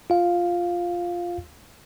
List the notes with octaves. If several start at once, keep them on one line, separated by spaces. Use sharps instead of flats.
F4 F5